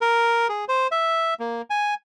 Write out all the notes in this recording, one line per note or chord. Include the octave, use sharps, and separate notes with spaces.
A#4
G#4
C5
E5
A#3
G#5